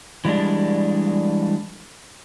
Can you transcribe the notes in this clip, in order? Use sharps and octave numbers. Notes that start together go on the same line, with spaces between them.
E3 G3 G#3 D4